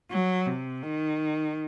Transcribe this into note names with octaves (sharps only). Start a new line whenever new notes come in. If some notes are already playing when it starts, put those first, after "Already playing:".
F#3
C3
D#3